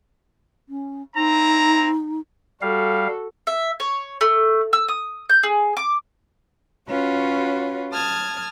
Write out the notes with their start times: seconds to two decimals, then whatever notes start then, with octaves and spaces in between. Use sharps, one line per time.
0.69 C#4
1.16 C4 D#4 E4 A#5
2.62 G3 F#4 A4 F5
3.47 E5
3.80 C#5
4.21 A3
4.73 E6
4.88 D#6
5.29 G6
5.43 G#4
5.77 D6
6.88 C#4 F4 F#4 B4 C#5
7.92 A5 D#6 F6 G#6